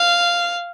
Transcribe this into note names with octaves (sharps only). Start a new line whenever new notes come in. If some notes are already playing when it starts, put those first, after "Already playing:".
Already playing: F5